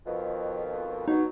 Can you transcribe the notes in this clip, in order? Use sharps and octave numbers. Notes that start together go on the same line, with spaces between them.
F2 B2 D#3
B2 F#3 D#4